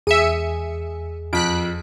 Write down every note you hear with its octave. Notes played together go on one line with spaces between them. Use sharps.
E2 G#4 E5 C#7 D#7
F2 F#6 B6 D7